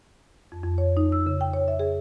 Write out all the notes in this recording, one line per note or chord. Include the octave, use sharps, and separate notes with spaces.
F2
F2
C#5
D#4
E6
C#3
G5
C#5
E5
G#4